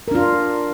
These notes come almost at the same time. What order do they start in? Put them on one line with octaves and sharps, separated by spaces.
A#4 D4 F4